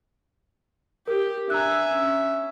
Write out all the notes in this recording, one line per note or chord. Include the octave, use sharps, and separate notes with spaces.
G4 A#4
D4 E5 G#5 A#5 E6 F#6
C#4